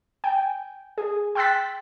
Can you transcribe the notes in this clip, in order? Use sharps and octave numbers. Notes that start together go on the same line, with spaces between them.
G5 G#5
G#4
G5 C6 E6 F#6 A6 B6